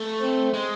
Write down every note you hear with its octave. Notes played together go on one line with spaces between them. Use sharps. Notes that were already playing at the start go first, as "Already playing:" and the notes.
Already playing: A3
C4
G#3